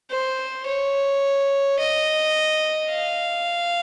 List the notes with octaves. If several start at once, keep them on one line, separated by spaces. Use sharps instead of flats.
C5
C#5
D#5
F5